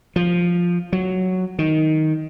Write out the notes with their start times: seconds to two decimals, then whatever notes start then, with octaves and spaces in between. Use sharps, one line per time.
0.16 F3
0.93 F#3
1.59 D#3